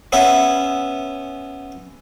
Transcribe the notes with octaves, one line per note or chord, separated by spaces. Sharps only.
B3 C#4 E5